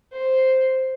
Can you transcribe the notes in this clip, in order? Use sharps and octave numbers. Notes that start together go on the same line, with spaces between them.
C5